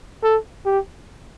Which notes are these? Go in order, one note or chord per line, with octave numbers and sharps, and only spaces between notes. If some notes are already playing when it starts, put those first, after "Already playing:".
A4
G4